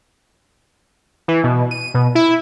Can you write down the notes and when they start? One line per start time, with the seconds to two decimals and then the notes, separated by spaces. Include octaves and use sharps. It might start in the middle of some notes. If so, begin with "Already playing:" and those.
1.28 E3
1.44 B2
1.71 D#7
1.94 B2
2.15 E4